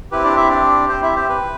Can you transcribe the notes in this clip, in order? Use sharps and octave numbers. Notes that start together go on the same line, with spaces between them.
C4 E4 G4 B4
D4 D5
E4 E5
D4 D5
C4 C5
E4 E5
C4 C5
B4